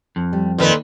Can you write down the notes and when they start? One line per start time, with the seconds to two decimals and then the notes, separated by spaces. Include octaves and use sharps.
0.16 F2
0.33 G3
0.58 D#2 A#2 D#3 A4 B4 C5